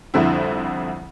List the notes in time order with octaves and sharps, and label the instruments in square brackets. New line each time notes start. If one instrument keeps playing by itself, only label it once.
[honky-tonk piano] C2 F2 D3 C4 E4